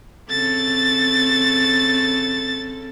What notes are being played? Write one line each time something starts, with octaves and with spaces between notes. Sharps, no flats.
C#3 C4 A4 A6